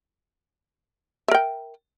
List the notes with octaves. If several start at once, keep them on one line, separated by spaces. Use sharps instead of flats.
A#4 E5 G5